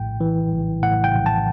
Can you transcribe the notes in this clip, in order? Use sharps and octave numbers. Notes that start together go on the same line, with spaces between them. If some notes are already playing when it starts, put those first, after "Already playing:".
Already playing: A#1 A2 G5
E3
A#1
A2 F#5
G5
A#1
A5